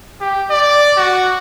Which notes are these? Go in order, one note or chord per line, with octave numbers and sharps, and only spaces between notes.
G4
D5
F#4